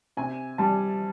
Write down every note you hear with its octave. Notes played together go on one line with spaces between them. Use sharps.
C3 G#5
G3 A5